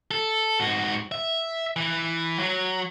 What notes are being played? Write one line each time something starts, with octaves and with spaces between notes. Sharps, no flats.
A4
G#2 F#4
E5
E3
F#3